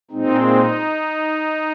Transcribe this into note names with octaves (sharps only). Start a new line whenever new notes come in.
A#2 G#3 C4 D#4
D#4